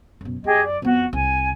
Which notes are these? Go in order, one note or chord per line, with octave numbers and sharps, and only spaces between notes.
F#2 B2
F#2 G4 G#4 D#5
D5
F2 B3 F#4
C2 G#5